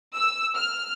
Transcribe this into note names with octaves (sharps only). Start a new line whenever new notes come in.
E6
F6